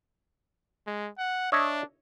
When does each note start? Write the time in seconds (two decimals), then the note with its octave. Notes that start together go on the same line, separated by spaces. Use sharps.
0.87 G#3
1.18 F#5
1.52 D4 C#5 D#5 E5